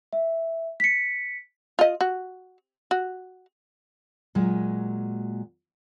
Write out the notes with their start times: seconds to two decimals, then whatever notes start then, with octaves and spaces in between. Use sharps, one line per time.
0.13 E5
0.80 B6 C#7
1.79 F4 D#5
2.01 F#4
2.91 F#4
4.35 A#2 F#3 G#3